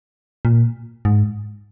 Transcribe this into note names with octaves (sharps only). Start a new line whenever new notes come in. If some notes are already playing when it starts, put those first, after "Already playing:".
A#2
G#2